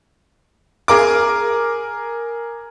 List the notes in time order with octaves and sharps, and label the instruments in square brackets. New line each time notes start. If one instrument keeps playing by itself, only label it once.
[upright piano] G#4 A#4 D6